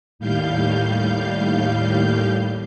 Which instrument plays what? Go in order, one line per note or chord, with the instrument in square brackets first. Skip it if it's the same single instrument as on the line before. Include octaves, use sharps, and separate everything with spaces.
[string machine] D#2 A2 G3 F5 G6